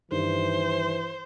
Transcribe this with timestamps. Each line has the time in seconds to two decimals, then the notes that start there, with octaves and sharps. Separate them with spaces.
0.11 G2 D#3 E3 C5